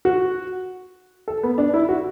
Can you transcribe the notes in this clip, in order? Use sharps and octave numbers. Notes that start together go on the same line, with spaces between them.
F#4
A4
B3
D4
E4
F#4